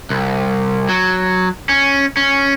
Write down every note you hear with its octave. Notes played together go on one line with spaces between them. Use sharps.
C2
F#3
C#4
C#4